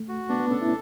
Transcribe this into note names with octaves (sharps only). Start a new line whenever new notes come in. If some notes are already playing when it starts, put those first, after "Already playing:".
Already playing: A3
F#4
B3 D4
B3
C#4 A4
E4